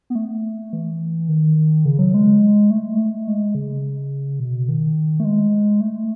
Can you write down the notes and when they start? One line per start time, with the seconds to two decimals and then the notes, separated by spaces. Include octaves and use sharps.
0.10 B3
0.15 A3
0.73 E3
1.29 D#3
1.85 C#3
1.99 F#3
2.14 G#3
2.71 A3
2.94 G#3
2.98 A3
3.27 G#3
3.55 C#3
4.40 B2
4.69 D#3
5.20 A3
5.25 G#3
5.81 A3